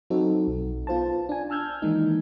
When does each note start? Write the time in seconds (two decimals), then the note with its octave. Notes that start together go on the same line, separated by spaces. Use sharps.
0.10 F#3 C4 D#4 F#4 A4
0.47 B1
0.87 B3 F4 C5 A5
1.29 D4 G#5
1.50 A5 E6 F6 G6 G#6
1.82 D#3 E3 G#3 A#3 D#4